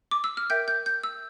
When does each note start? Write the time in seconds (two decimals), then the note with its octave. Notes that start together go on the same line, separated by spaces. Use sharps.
0.11 D6
0.24 E6
0.37 F6
0.50 A#4 E5 G5 G6
0.68 G6
0.86 G6
1.04 E6